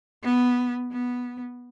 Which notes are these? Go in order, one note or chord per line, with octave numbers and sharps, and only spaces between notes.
B3
B3